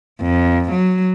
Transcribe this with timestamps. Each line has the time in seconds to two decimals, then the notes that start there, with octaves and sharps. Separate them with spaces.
0.21 F2
0.69 F#3